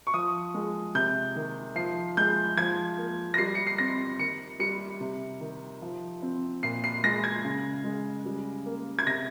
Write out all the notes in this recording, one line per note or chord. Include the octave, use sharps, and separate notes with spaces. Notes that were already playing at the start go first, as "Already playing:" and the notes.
C#6
F3 D#6
G#3
C3 G6
D#3
F3 C7
G#3 G6
F3 G#6
A#3
A#6
G3 C7
C#7
C7
C4 A#6
D#3 C#7
G3 C#7
C3
D#3
F3
C4
A#2 C7
C7
G#3 A#6
G#6
C#3
G#3
G3
A#3
G#6
C3 A#6